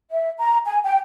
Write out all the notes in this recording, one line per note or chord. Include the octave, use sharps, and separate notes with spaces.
E5
A#5
G#5
G5